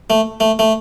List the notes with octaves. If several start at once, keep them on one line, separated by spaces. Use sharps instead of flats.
A3
A3
A3